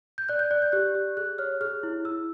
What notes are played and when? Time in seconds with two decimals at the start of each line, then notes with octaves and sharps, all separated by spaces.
0.18 G6
0.29 D5 F#6
0.39 G6
0.51 D5 F#6
0.62 G6
0.72 G4 F#6
0.95 G4
1.17 G#4 F#6
1.38 C#5 F6
1.61 G#4 F6
1.83 E4
2.05 E4 E6